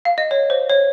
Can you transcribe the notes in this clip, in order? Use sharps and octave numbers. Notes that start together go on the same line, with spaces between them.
F5
D#5
C#5
C5
C#5